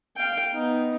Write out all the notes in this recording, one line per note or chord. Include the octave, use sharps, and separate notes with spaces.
F5 G5
B3 D#4